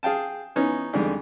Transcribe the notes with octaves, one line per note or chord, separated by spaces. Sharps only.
G#4 F5 G5 A5
E3 B3 C#4 D#4
F2 D3 D#3 G3 G#3